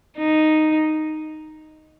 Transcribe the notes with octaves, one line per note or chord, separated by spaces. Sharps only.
D#4